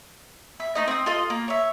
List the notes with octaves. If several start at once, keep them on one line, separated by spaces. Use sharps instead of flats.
E5
A3 D#4 D#5
C4 D#6
F4 A4 D#5
A#3
C#5 E5